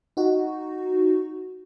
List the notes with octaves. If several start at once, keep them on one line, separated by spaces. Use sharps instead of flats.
D#4 F#4